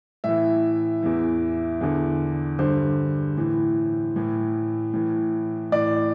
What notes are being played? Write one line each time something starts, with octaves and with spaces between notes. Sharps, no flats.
A2 E3 E5
E2 E3
E2 D3
G2 D3 C5
A2 E3
A2 E3
A2 E3
A2 E3 D5